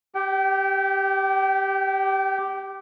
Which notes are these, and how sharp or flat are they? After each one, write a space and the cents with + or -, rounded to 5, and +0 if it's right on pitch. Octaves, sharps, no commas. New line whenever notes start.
G4 +0 G5 -35